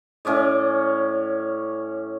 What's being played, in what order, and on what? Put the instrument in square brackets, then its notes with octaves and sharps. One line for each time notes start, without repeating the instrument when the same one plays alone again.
[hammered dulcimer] A2 C#4 D5 D#5